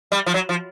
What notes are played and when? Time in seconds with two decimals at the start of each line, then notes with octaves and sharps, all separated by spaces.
0.12 G3
0.26 F3
0.34 F#3
0.49 F3